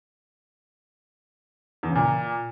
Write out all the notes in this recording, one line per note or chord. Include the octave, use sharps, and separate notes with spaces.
E2
C#3
A#2